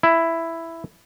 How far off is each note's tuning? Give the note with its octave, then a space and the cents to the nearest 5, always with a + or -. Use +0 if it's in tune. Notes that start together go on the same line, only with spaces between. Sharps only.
E4 +5